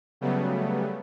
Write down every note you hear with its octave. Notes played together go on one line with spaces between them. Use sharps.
C#3 F#3 G3 A3 B3